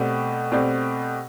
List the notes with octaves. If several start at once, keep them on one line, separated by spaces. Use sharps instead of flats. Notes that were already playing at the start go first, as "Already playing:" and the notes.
Already playing: B2 A3 C4 G4 D5
B2 A3 C4 G4 D5